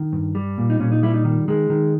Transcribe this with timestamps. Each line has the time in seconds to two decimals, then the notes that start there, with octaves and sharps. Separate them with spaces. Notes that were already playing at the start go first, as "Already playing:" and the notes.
Already playing: D#3
0.13 G2
0.35 G3
0.58 A#2
0.70 D#4
0.80 A#2 C#4
0.92 D#4
1.03 G3 E4
1.14 D#4
1.25 D#3
1.48 D#3 G#3
1.70 D#3